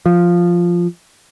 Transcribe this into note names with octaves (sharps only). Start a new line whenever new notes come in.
F3